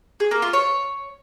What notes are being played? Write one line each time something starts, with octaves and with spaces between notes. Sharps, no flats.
G#4
A#3
F4
C#5